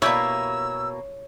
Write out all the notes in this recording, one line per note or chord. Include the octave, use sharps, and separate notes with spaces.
B2 A#3 E4 G4 C#5 E6